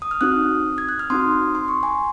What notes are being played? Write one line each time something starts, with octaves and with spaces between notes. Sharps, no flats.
D#6
F6
C4 D#4 F#4 D#6 F#6
G#6
F#6
F6
C4 D#4 F#4 C6 D#6
C6
C#6
G#5 C6